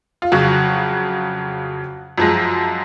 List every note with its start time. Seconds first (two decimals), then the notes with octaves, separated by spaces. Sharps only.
0.22 F4
0.32 F2 C#3 F#3 F#4
2.18 F#2 F3 G#3